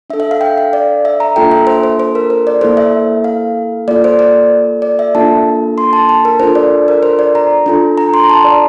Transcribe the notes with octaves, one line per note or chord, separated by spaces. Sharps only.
D4 A4 E5
E5
F5
G5
F5
D5
E5
A#5
A#3 D4 F4 A4 G5
E5
C5
C5
C5
A#4
C5
D5
A#3 E4 A4 C5
E5
F5
A#3 F4 A4 D5
C5
D5
D5
E5
A#3 D4 F4 A4 A5
C6
A5
A5
A#4
D4 F4 A4 C5
D5
A#4
C5
D5
A#5
D4 F4 A4
A#5
C6
A#5
A5
D5